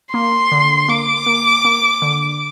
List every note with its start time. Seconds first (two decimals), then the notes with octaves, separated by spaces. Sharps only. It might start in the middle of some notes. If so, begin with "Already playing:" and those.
0.14 A#3 C6
0.52 D3
0.89 A#3 D6
1.26 A#3
1.65 A#3
2.02 D3